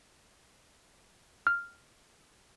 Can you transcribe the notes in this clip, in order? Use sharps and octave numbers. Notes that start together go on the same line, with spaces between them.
F6